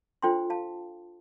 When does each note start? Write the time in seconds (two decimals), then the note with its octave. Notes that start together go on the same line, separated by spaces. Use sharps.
0.22 D4 F4 A4 C5 G5 C6
0.50 F5 A5